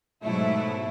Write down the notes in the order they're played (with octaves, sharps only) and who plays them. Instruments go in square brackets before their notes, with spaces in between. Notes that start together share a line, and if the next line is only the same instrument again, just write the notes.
[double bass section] G#2 [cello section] B2 F#3 A3 E4